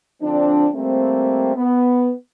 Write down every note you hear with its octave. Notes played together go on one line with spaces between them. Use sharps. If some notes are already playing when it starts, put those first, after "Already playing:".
D3 F3 C4 D4
G3 A3 A#3 C4
B3